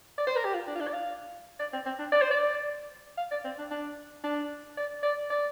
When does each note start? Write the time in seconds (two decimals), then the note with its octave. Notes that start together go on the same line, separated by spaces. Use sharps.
0.18 D5
0.27 C5
0.36 A#4
0.45 G4
0.54 F4
0.67 D4
0.75 F4
0.80 D4
0.88 D5
0.93 F5
1.59 D5
1.73 C4
1.86 C4
1.99 D4
2.12 D5
2.21 C5
2.31 D5
3.17 F5
3.31 D5
3.44 C4
3.58 D4
3.70 D4
4.23 D4
4.77 D5
5.03 D5
5.30 D5